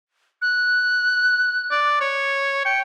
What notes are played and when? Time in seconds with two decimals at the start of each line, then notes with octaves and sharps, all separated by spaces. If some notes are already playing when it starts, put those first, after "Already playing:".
0.42 F#6
1.70 D5
2.00 C#5
2.65 G5 C#7